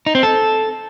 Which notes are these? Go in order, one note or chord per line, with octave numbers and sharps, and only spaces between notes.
D#4
C4
A4